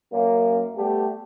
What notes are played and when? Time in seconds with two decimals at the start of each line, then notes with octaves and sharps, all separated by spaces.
0.12 F#2 A#3
0.76 G3 A3 B3 G4